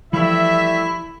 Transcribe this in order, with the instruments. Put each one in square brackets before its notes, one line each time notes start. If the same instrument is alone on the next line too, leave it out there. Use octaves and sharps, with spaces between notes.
[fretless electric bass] E3 F3 [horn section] G3 A3 E5 [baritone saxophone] E4